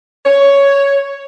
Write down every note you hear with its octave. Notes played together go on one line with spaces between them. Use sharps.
C#5